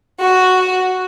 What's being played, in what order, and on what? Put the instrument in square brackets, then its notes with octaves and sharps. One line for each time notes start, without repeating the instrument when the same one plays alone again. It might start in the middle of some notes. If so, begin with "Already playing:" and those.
[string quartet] F#4